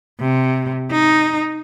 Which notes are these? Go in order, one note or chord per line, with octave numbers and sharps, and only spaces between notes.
C3
D#4